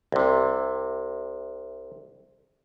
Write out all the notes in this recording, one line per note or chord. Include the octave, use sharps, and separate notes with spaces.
C2 C3